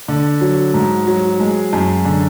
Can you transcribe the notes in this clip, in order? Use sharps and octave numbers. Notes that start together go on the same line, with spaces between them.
D3
F#3
G#2
F#3
G#3
F#2
D3